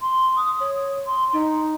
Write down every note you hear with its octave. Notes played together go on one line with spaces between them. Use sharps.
C6
D#6
C#5
C6
D#4